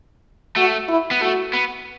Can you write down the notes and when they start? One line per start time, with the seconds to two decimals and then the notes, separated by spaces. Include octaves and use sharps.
0.56 A3 F#4
0.89 E4
1.11 B3
1.21 A3 F#4
1.53 B3